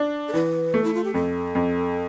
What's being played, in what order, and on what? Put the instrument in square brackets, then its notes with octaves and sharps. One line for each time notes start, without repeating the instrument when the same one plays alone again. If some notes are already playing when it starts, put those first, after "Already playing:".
Already playing: [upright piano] D4
[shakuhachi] A4
[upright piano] E3 [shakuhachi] B4
[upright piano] A3
[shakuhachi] E4
F4
G4
[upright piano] F2 [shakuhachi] A4
[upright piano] F2